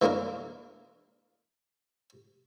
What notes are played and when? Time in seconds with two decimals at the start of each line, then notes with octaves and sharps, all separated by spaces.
0.02 E3 G#3 A#3 D4 A#4